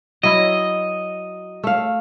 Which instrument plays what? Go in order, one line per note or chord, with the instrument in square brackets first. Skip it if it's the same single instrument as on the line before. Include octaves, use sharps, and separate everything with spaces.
[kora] F#3 E4 [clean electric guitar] D#5
[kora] A3 F5